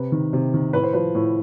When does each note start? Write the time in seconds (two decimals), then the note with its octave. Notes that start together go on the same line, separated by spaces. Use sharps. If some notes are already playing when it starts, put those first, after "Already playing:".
Already playing: C3 B4
0.12 D#3
0.33 C3
0.54 D#3
0.73 A2 B4
0.83 C5
0.93 F3 B4
1.15 A2